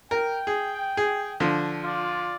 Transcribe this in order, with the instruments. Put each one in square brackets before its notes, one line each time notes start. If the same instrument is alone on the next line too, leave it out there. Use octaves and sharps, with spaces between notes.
[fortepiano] A#4 [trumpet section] G5
[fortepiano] G#4
G#4
D3 F3
[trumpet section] F4 D5